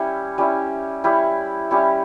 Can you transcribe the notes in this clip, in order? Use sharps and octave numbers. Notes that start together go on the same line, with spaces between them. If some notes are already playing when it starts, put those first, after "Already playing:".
Already playing: G3 C#4 E4
G3 C#4 E4
G3 C#4 E4
G3 C#4 E4